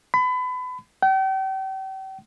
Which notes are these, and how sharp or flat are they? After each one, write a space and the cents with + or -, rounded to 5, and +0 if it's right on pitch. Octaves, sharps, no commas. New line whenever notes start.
B5 +30
G5 -40